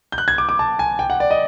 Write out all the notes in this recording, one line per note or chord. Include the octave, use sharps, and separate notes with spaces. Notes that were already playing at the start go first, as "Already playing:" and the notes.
G6
F#6
G#6
D6
D6
A5
G#5
G5
F#5
D5
D#5